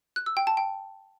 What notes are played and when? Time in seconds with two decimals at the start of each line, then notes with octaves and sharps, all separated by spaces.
0.16 F#6
0.26 E6
0.37 G5
0.47 A5
0.57 G5